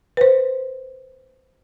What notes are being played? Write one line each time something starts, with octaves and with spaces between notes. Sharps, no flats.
B4 C5